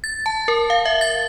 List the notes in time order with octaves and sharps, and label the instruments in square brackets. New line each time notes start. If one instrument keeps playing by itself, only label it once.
[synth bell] A6
A5
A#4
F5
E5
A6